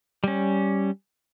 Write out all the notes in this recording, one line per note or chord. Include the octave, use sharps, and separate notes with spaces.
G3 C#4